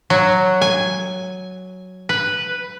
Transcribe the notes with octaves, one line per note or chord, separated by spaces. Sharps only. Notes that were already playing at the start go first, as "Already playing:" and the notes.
F#3
G#5
B4